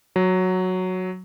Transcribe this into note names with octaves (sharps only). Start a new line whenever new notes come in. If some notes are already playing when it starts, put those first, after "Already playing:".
F#3